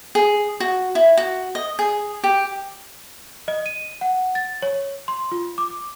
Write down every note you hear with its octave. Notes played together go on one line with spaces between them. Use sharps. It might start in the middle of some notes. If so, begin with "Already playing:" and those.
G#4
F#4
E4
F#4
D#5
G#4
G4
D#5
D#7
F#5
A6
C#5
C6
F4
D6